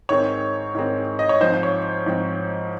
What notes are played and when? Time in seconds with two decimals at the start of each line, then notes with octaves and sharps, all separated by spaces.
0.09 G#2 D#3 G#3 C4 C#5
0.75 G#2 D#3 G#3 C4
1.19 D#5
1.29 C#5
1.40 G#2 F3 C4 C5
1.54 C5
1.63 C#5
2.06 G#2 F3 C4